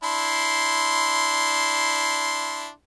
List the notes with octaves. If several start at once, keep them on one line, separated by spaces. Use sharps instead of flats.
D4 E4 C6